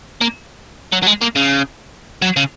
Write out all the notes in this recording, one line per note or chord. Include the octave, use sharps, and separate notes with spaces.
A#3
F#3
F#3
G#3
A#3
C#3
F#3
C#3